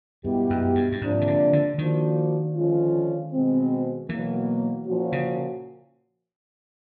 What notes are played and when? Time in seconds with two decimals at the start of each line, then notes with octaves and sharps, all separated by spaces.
0.24 G2 B2 G#3 B3 E4 G4
0.50 F#2
0.75 G2
0.92 G2
1.01 G#2 C3 F3 A#3 D4
1.21 D#3
1.27 D3
1.53 D3
1.78 D#3 F3 A#3 D4 F#4
2.55 D3 F3 G#3 C#4 F4
3.33 B2 G#3 C4
4.09 B2 E3 F#3 A#3
4.87 A#2 F3 A#3 C#4 F#4
5.12 C#3